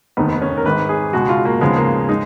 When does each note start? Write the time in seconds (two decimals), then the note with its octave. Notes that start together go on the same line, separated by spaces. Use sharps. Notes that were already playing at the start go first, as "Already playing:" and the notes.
0.17 F1 D#2 D#3 B3
0.33 B3
0.42 C#4
0.57 A#4
0.65 G#1 G#2 D#3 B4
0.89 G#4
1.13 C#2 B2 G#3 F#4
1.29 F4
1.45 A#3
1.61 D#2 C#3 F3 G#3 B3
1.77 A#3
2.09 G#3 D#4